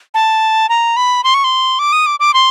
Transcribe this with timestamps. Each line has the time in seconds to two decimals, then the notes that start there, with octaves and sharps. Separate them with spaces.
0.14 A5
0.69 A#5
0.97 B5
1.24 C6
1.34 C#6
1.44 C6
1.79 D6
1.93 D#6
2.06 D6
2.20 D6
2.34 C6